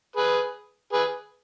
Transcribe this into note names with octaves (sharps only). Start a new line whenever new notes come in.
G#4 B4
G#4 B4